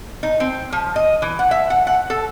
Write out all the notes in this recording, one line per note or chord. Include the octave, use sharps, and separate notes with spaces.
D#4
C4
F3
D#5
E3
F#5
E5
F#5
F#5
A4